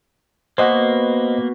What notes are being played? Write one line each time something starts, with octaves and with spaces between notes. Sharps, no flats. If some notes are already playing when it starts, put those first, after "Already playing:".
B2 A#3 B3 F#4 C5 D#5 F#5